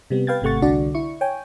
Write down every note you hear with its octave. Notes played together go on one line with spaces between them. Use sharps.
C3 G3 B3
B4 F5 G5 G#6 A6
G#1 C3 A3 F#5 C#6 A6
C2 D3 D4 F#4 D5
E4 C#6
C#5 G5 G#5